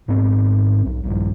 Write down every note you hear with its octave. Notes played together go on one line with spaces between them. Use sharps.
G#2 B3 C4
B1
A#1 G2